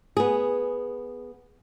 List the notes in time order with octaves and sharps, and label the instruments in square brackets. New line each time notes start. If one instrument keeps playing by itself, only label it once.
[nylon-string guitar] B3 G#4